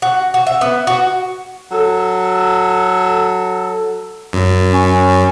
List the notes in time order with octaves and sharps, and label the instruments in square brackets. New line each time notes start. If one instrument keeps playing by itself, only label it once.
[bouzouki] F#4
F#4
E5
B3
F#4
[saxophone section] F#3 A4
[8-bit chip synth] F#2
[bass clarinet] C#4